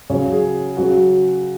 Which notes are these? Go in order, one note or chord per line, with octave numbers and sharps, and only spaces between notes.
C#3 F#3 C#5
G#4
C#3 F#3 F#4